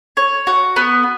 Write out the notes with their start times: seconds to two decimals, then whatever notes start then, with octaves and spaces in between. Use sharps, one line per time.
0.17 C#5
0.47 F#4
0.76 B3